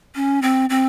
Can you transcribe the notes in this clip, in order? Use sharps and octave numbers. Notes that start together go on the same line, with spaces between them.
C#4
C4
C4